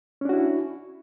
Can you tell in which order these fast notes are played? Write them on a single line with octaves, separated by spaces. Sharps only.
C#4 D4 F#4 E4